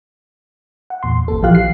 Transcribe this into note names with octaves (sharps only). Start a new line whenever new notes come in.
F#5
E2 A#2 C6
G#1 A#3 A4
A#1 E3 F3 G4 F5 F#6
C7